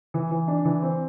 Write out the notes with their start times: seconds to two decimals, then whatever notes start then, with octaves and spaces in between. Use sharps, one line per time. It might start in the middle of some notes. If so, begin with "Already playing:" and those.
0.14 E3
0.31 E3
0.48 D4
0.65 E3
0.82 C4